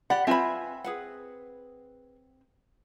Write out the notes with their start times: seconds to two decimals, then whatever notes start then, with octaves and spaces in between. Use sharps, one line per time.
0.10 G4 D5 F#5 B5
0.27 C4 F4 B4 E5 G#5 B5
0.84 G#4 B4 F#5